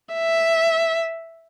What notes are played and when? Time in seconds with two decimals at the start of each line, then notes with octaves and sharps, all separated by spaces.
0.14 E5